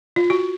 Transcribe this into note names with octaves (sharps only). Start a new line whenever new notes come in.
F4
F#4